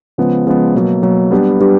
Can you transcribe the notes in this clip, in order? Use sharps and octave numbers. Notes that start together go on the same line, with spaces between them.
C#3 F3 G#3 B3
C#3 F3 G#3 B3
B2 F#3 A#3
B2 F#3 A#3
G3 B3 D4 G4 B4
G3 B3 D4 G4 B4